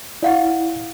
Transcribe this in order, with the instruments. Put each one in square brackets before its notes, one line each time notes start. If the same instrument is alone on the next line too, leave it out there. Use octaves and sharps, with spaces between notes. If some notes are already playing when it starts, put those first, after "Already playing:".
[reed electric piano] E4 [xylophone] D5 F5 F#5